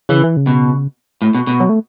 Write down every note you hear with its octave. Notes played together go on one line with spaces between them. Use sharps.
C#3 E3
E3
C#3
B2
A2
B2
B2
F#3
A3